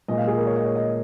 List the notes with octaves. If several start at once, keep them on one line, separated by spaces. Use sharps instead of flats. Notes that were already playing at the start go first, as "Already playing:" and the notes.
A#2 G#3 D#5
F5
G#4
A#4
C#5
D#5
C#5
D#5